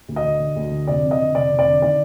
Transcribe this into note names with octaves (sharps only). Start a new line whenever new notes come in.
D2
D#5
D3
D3
D2
D3
F1 D5
F2
D#5
D3
F1 D5
F1
D5
D3
D#3 D5